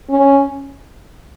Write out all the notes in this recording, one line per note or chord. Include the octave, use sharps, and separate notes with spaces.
C#4